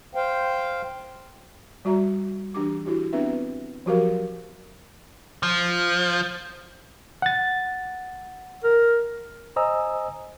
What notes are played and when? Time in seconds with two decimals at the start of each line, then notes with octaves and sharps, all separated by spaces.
0.15 C5 F5 G5
1.85 G3 F#4 E5 A#5
2.54 E3 D4 G4 D6
2.86 E4 F#4 G4
3.13 B3 C4 D4 B4 E5
3.86 F3 F#3 F#4 G4 A#4 F5
5.43 F3
7.22 F#5 A6
8.64 A#4
9.56 C5 D#5 G#5 A#5 D#6 E6